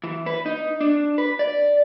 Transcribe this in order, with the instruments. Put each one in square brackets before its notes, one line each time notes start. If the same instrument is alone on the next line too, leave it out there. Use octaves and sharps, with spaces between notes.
[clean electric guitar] E3
B4
D#4
D4
B4
D5